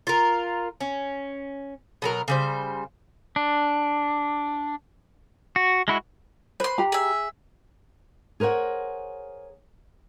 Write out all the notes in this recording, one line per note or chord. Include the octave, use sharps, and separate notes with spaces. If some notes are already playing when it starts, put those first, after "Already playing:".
F4 A#4
C#4
B2 F#3 A#4
C#3 G3 C5
D4
F#4
G#3 E4 F#4
B4 C5 C6
G4 A#5
G#4 E5
G#4 A#4 C5 C#5 F#5